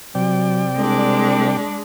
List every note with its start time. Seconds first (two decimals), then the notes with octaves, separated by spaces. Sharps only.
0.15 C3 F#3 D5 G5
0.76 C2 G#3 D4